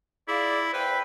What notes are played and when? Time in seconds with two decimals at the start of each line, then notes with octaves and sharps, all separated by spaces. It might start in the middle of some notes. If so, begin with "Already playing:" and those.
0.28 E4 F4 G#4 D5
0.74 E2 B4 C5 G5